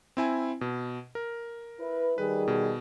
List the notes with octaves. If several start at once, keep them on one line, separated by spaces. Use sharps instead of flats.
C4 E4 G#5
B2
A#4
E4 B4
D#3 G3 G#4 B4
B2